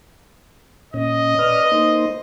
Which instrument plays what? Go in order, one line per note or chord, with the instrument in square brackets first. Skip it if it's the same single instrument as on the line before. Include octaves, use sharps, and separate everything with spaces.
[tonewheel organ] A#2 C#4 [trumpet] D#5
[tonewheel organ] B4 D5 F6
A#3 D#4 C5